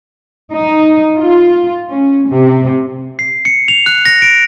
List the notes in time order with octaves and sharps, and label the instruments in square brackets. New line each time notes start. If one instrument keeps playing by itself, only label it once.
[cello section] D#4
F4
C#4
C3
[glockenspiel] C7
C#7
F7
F#6
A#6
D7